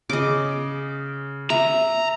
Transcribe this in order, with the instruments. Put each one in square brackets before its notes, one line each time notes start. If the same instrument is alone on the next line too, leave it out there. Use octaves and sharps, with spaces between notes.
[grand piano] C#3 [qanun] D#5 D6
[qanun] E5 [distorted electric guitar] A#5